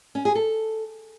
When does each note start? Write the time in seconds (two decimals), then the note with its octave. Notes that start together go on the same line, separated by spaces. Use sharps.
0.15 C#4
0.25 G#4
0.35 A4